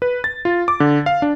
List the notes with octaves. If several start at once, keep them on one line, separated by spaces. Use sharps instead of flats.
B4
A6
F4
D6
D3
F5
D4